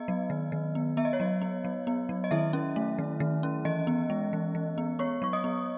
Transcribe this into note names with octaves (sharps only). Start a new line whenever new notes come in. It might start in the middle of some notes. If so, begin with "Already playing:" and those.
Already playing: B3 D#5
F#3
D#3
D#3
B3
B3 E5
D#5
C#5
F#3 D#5
B3
F#3
B3
F#3
D#5
D#3 E4 E5
C#4
A3
D#3
D#3
C#4
E3 D#5
B3
G#3
E3
E3
B3
B3 C#5 C#6
F#3 C#6
D#5 D#6
B3